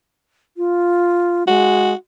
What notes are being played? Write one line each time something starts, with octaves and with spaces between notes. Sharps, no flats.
F4
G#3 F#4